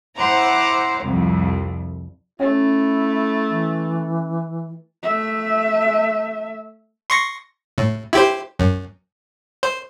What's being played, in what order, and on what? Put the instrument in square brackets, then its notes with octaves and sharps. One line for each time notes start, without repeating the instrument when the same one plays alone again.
[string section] E4 C5 F#5 A#5 D6
C2 F2
[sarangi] A3 [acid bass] C#4 [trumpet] E4
[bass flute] E3
[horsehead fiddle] A3 E5
[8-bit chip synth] C6 C#6 A#6
A2
E4 G4 C5
F#2
C5